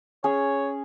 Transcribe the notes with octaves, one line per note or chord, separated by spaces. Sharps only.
C#4 G#4 C#5